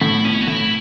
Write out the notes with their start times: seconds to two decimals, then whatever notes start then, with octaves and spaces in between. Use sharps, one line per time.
0.01 A2 E4
0.25 B2 C#4
0.41 F#4
0.47 A2 E4